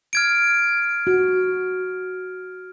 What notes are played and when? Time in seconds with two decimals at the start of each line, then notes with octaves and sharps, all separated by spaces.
0.13 F6 G#6 D7
1.07 F#4